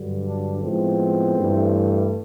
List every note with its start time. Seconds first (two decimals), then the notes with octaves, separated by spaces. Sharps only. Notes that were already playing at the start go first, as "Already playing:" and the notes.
Already playing: G2 D3 F#3
0.26 D4
0.63 A2 F3 G#3 B3 C4
1.37 G2 E3 A3